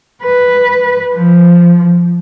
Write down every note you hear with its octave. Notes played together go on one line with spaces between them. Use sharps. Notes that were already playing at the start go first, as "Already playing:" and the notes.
B4
F3